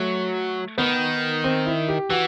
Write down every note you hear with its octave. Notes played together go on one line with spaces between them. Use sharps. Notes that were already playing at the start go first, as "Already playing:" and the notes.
Already playing: F#3 A3
D#3 B3
C4
E4
G4
E3 F#4